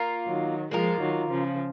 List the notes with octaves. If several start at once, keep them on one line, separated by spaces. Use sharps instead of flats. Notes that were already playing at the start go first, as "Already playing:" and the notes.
Already playing: A#3 F4 A#4
D#3 F#3
F3 G#3 A#3 F4 A#4
D#3 F#3
C#3 F3